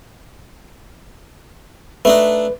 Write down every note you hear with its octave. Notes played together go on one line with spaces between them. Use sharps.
A3 D4 D#4 B4